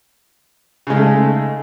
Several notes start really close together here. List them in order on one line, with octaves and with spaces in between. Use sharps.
C#3 G#3 D#4 A3